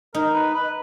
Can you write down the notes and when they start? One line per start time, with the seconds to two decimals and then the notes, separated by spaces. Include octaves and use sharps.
0.14 D#4 A#4
0.34 B4
0.53 B4